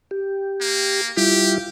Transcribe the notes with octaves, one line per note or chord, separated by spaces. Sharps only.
G4
A#3
G3 E4 F4 G4